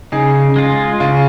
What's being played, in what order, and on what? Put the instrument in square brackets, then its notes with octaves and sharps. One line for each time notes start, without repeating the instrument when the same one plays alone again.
[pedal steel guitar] C#3 [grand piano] D#4 G#4
[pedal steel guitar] G#3 F4
[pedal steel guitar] C#3 [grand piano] F4